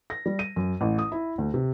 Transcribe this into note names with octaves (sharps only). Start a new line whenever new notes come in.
A#6
G3
D#7
F#2
A1
D#6
E4
D2
C3